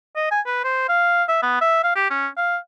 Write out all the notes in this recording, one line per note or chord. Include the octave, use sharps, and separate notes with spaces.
D#5
G#5
B4
C5
F5
E5
B3
E5
F5
G4
C#4
F5